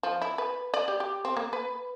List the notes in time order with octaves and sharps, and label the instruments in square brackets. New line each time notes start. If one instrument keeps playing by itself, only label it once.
[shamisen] F3
E4
B4
D5
G4
G4
C4
A#3
B4